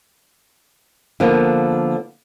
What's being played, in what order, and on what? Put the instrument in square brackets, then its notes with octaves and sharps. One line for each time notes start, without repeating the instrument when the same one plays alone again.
[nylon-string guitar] D3 F3 A#3 B3